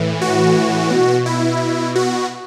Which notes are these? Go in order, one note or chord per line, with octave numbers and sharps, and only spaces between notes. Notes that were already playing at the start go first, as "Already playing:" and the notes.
Already playing: A2 E3
F#4
B2
E4
F#4